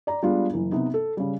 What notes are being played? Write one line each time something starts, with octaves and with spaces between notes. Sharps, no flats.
D5 A#5
G3 G#3 B3 D4 F4
F#1 E3
C3 B3 D#4
A4
C#3 G3